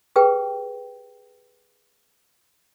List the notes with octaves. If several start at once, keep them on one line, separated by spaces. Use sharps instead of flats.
G4 G#4 B4 G5